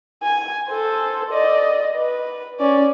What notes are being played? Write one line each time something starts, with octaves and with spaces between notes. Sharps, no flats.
G#5
A4 C5
D5 D#5
B4
C#4 D5